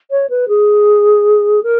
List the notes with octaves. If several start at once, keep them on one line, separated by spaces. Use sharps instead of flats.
C#5
B4
G#4
A#4